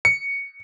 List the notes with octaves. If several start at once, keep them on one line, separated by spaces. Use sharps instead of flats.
C#7